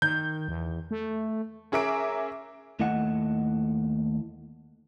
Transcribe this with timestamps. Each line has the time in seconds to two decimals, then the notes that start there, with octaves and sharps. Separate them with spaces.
0.02 D#3 G6
0.48 E2
0.91 A3
1.72 C#4 G#4 A#4 E5 D6 D7
2.80 D#2 A3 E4 D#5 F#5